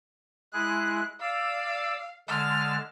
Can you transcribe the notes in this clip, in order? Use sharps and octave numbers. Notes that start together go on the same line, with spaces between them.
G#3 E4 G#4 F#6
D5 F5 E6
D3 G#3 A5 F6